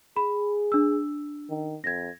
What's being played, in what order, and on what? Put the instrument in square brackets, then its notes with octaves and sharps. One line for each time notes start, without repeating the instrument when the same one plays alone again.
[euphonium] G#4 [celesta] B5
[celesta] D4 E6
[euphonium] D#3
[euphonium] F2 [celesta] G#6 A#6